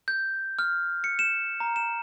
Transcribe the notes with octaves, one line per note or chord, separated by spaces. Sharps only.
G6
F6
C#7
E7
A#5
E7